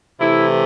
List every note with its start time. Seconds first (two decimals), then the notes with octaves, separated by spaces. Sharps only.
0.20 C3 E3 A3 E4